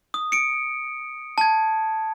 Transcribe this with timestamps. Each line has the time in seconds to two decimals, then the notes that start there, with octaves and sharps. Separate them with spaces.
0.14 D#6
0.32 C#7 D7
1.38 A5 G#6